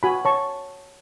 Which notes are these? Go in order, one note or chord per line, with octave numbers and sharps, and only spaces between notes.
F#4 G#5 B5
C#5 A5 C#6